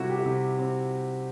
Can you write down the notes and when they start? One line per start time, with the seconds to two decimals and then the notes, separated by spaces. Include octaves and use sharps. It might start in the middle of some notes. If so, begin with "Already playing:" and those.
Already playing: C3 G3 E4 F#4
0.10 G4
0.18 F#4
0.26 C3 E4
0.58 C4